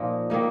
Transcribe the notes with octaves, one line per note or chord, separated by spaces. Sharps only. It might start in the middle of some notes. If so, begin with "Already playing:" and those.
Already playing: A#2 F3 A#3 D#4
D#3 A#3 D#4